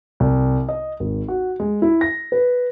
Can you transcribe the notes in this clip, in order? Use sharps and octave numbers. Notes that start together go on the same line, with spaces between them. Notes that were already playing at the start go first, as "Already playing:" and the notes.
C2
D#5
G#1
F#4
G#3
E4
A#6
B4